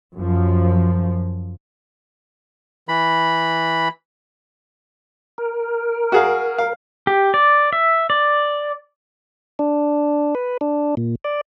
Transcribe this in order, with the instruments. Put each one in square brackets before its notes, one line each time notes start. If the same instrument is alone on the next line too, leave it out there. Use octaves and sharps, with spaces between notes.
[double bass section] F#2 F3
[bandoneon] E3 B5
[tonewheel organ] A#4
[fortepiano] F#4 G#4 F5
F5
[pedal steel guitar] G4
D5
E5
D5
[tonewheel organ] D4
B4
D4
A#2
D5